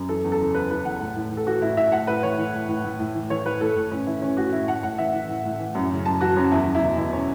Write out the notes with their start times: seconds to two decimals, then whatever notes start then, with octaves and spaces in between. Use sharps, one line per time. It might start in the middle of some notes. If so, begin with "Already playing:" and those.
Already playing: F#2
0.08 E3 A4
0.24 E2
0.32 A4
0.39 C#3
0.54 E2 B4
0.70 E3 B4
0.85 E2 F#5
1.01 A2
1.16 A2
1.31 E3
1.37 A4
1.47 E3 F#4
1.62 A2 E4
1.77 A2 E5
1.92 A2 F#5
2.07 A2 B4
2.23 E3 C#5
2.38 E3
2.53 A2
2.68 A2
2.84 A2
2.99 A2
3.15 E3
3.30 E3 C#5
3.45 A2 B4
3.61 A2 A4
3.76 A2
3.91 A2 C#4
4.07 E3 E4
4.22 E3 C#4
4.37 A2 F#4
4.52 A2 E4
4.68 A2 F#5
4.83 A2 F#5
4.98 E3 E5
5.14 E3
5.29 A2
5.45 A2
5.59 E3
5.75 F#2
5.91 C#3
6.05 F#2 A5
6.21 E3 F#4
6.36 F#2 C#4
6.51 E2 E4
6.67 E2
6.75 E4
6.82 B2
6.97 B2 E4
7.12 C#4